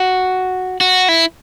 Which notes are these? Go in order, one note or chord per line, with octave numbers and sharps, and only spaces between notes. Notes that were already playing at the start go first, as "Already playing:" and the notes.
Already playing: F#4
F#4
E4